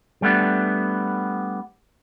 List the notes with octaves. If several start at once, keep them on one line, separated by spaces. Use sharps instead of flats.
G3 A3 B3 D4